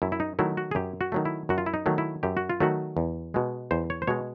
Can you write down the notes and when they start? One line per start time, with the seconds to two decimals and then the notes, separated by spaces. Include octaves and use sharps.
0.02 F#2 E4
0.12 E4
0.20 D#4
0.39 D#3 F#3 A3 E4
0.57 F#4
0.71 G#4
0.75 F#2 G4
1.01 F#4
1.12 D#3 F#3 A3
1.25 E4
1.49 F#2 F#4
1.58 F4
1.66 E4
1.74 D#4
1.86 D#3 F#3 A3
1.98 E4
2.23 F#2 G4
2.37 F#4
2.50 F4
2.60 D#3 F#3 A3 F#4
2.97 E2
3.34 B2 G#3
3.71 E2 C5
3.90 C#5
4.02 C5
4.07 B2 G#3 C#5